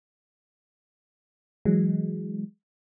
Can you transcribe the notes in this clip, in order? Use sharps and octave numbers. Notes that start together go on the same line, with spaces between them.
E3 F#3 G#3